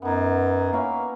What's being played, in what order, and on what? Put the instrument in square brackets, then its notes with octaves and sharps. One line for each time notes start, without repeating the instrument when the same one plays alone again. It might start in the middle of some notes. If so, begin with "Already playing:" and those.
[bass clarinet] F#2 [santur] B3 D#4
[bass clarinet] A#3 [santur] C#4 E4 B4